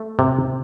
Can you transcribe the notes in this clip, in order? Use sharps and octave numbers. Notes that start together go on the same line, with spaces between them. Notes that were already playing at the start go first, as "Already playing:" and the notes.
Already playing: A3
C3